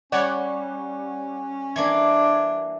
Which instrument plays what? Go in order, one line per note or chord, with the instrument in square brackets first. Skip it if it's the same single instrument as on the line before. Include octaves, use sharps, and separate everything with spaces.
[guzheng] G3 [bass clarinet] C#4 [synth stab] C#5 D5 F#5
[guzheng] E3 A#3 [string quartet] D4 [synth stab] G#6